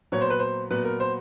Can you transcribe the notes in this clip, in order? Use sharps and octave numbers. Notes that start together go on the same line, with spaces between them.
A#2 F#3 B3 C#5
C5
B4
C5
A#2 F#3 B3 B4
A#4
C5